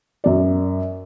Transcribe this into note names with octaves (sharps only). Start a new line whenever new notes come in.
F#2 D5